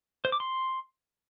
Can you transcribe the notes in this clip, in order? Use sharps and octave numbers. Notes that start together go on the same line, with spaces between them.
C5
D6
C6